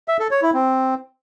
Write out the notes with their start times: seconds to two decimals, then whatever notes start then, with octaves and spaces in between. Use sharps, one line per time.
0.08 E5
0.20 A4
0.31 C#5
0.42 E4
0.54 C4